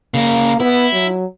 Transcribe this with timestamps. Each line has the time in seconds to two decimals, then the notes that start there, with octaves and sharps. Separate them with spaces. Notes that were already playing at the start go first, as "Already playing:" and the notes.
0.14 C#3 A#3 A#4
0.60 B3 E4
0.93 F#3